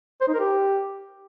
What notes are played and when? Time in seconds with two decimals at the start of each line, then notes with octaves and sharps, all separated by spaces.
0.21 C5
0.28 D#4
0.34 A#4
0.40 G4